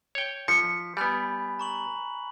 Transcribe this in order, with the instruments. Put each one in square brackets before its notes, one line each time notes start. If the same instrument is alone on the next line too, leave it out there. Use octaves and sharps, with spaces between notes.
[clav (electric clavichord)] C#5 G5
[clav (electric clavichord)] F3 [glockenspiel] B6 [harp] C#7
[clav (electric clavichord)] G3 B3 [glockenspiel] G#5 B5 F#6
[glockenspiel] A#5 C#6 F#7